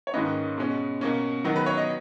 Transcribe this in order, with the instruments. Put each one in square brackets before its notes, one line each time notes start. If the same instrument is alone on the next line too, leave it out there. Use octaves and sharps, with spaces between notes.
[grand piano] C#5
G#2 D#3 A#3 C#4 B4 D#5
B2 G#3 C#4
B2 A#3 C#4
D#3 F#3 B3
B4
C#5
D#5